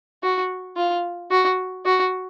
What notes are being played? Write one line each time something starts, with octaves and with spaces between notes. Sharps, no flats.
F#4
F4
F#4
F#4